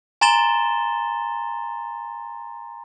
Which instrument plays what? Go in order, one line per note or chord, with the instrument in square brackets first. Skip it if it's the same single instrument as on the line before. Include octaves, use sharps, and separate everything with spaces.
[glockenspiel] G#5 A#5 C6 A6 E7 G7